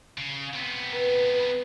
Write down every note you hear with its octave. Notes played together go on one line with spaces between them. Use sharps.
C#3
C3 B3
B4